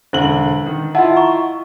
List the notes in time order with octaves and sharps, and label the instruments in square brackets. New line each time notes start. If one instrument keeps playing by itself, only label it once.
[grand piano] E1 D3 F#7 [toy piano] C5
[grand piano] D#3
[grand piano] E4 F4 [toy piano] D#5 F#5 A5
[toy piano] A#5 C#6